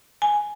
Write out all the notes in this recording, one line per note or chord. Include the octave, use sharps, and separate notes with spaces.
G#5